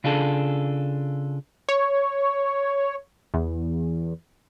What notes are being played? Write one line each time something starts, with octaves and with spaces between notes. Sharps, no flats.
C#3 D4 F4 G#4 A4
C#5
E2